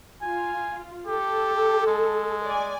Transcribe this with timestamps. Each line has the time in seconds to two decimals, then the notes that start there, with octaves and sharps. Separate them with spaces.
0.22 F4 G#5
1.07 G4 A4
1.87 G#3
2.45 D5 G#5